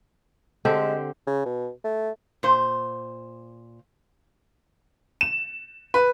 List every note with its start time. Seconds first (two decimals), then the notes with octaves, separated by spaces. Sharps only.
0.65 D3 G#3 C4 G4
1.27 C#3
1.46 B2
1.84 A3
2.43 A#2 C5
5.21 E7
5.94 B4